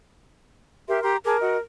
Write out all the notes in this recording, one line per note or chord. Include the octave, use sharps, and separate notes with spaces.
G4 A#4 E5 C6
G4 A#5 C6
G#4 A#4 A5 D6
F#4 D#5